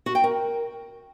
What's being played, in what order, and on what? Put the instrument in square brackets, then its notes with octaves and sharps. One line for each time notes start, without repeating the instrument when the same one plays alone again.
[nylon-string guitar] F#4
G5
A#4